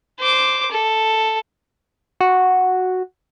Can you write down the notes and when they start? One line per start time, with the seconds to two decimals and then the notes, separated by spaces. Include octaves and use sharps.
0.19 C5 D6
0.71 A4
2.20 F#4